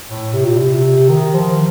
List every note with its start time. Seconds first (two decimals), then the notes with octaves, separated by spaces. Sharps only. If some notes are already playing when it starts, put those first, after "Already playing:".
0.09 A2
0.33 C3
0.45 A#2
0.58 C3
1.09 D#3
1.35 F3